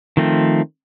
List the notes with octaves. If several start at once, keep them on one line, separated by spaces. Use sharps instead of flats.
D#3 F3 A3 C4